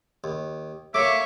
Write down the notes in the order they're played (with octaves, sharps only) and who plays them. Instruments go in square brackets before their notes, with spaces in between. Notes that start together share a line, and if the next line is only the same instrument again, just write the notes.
[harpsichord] D#2
[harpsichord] A3 A#3 [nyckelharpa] C#5 C#6 [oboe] E5 [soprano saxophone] D6